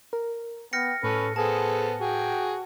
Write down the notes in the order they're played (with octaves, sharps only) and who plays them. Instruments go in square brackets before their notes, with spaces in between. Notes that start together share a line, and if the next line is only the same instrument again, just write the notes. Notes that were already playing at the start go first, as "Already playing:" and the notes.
[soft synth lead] A#4
[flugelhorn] B3 [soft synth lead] G5 [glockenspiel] F6 A#6 C#7
[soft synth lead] A2 [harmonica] C#4 B4 [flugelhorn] A4
[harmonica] B3 A4 C5 [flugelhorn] G#4 [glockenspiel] A5
[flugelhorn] F#4 [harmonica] G#4 G5